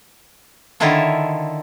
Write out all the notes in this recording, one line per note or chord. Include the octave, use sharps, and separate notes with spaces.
D3 D#3 E4 F4 A4 C#5